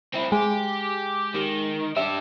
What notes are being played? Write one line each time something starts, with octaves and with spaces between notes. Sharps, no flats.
C4 E4
G#3 G4
D#3
D4 G4 E5